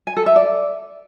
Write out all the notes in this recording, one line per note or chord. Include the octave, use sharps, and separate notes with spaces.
G#5
A4
E5
D5